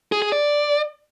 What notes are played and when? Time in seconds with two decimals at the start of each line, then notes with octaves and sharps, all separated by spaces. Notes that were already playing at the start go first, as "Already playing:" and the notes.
0.12 G#4
0.22 G#4
0.32 D5